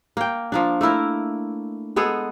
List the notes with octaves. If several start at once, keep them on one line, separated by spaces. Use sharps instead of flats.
A#3 G5
F3 A#3 D4
A3 A#3 E4 A#4
G#3 B3 G#4 A4